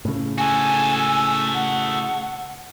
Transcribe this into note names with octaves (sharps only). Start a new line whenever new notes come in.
A2 C#3
F#4 A4 G#5
F#5